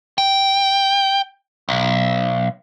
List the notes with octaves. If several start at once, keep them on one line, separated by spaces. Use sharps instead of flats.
G5
B1